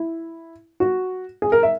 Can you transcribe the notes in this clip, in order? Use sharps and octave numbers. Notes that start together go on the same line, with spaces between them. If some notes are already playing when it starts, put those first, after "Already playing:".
Already playing: E4
F#4
G#4
A#4
E5